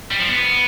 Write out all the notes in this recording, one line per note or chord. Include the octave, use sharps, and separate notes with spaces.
G3
F3
B3